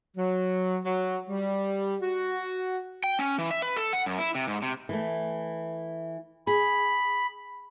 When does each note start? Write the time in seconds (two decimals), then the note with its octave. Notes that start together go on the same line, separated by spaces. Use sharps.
0.17 F#3
0.83 F#3
1.29 G3
2.01 F#4
3.04 G5
3.19 C#4
3.38 E3
3.51 E5
3.62 B4
3.76 A4
3.93 F#5
4.06 F#2
4.18 E4
4.35 C3
4.48 G#2
4.62 C3
4.89 E3 A3
6.47 G#4 B5